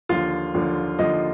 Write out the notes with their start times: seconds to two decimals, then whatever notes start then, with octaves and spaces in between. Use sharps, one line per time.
0.09 D#2 D3 F3 F4
0.54 D#2 D3 F3
0.99 D#2 D3 F3 D#5